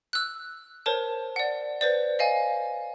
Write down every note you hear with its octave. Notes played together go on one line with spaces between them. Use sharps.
E6 F#6
A#4 C5 C#5 A5
D5 F#5
B4 C5 D5
D#5 F5 G#5